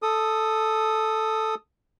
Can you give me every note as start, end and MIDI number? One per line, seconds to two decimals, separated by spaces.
0.02 1.55 69
0.02 1.55 87